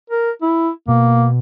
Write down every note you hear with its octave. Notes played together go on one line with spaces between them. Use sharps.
A#4
E4
B2 A#3